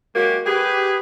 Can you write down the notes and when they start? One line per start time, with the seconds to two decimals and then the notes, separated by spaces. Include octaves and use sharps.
0.15 F#3 G#3 A#3 F#4 G4
0.45 G4 G#4 B4